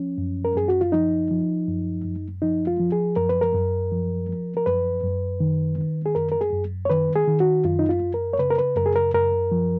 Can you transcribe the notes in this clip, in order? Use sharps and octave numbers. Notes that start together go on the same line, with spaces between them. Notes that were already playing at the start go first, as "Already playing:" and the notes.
Already playing: F3 C#4
F#2
A#4
F#2 G#4
F#4
F4
F3 D#4
F3
F#2
F#2
F3 D#4
F4
F3
G#4
F#2 A#4
B4
A#4
F#2
F3
F3
A#4
F#2 B4
F#2
D#3
D#3
G#4
F#2 A#4
A#4
G#4
F#2
C#5
D#3 B4
G#4
D#3
F#4
F#2 F4
D#4
F4
F#2
A#4
C#5
C#3 B4
A#4
B4
F#2 A#4
G#4
A#4
F#2 A#4
F3